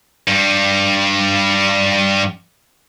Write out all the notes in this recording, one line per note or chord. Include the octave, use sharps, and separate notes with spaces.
G2 G3